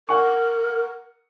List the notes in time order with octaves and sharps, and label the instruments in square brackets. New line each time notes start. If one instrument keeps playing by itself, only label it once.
[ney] A#4 [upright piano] F#5 C#6